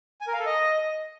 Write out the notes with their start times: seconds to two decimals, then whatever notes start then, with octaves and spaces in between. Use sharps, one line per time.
0.21 G#5
0.27 A#4
0.33 F5
0.39 A4
0.46 D#5